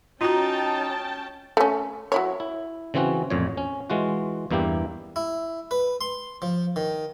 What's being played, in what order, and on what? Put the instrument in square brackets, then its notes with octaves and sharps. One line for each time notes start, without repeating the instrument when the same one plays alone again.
[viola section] C#4 G5 A5 [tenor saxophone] D#4 [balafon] F4 F#4 A#5
[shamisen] A3 C#4
F#3 E4 C#5
[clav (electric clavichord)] E4
C#3 E3 C4 C#4 F#4
A1 F2 A#2 C#5
C#4
E3 G#3 F4 F#4
E2 G2 A#3 E4 G4
[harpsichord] E4
B4
C6
F3
D#3